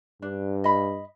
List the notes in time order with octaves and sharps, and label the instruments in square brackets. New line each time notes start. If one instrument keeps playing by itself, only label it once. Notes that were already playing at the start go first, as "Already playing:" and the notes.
[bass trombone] G2 [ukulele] D4
[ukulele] D#5 B5